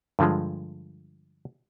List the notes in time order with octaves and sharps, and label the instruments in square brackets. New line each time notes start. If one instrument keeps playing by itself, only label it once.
[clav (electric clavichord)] G2 D3 F3 G#3